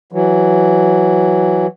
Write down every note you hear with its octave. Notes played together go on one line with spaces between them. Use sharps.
E3 F#3